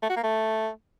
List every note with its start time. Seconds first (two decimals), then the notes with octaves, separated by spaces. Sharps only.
0.03 A3
0.09 F#4
0.16 A#3
0.23 A3